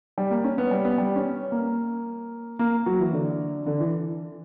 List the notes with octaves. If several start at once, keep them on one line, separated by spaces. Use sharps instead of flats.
G3
A#3
C#4
B3
G3
B3
G3
C#4
A#3
A#3
F#3
E3
D3
D3
E3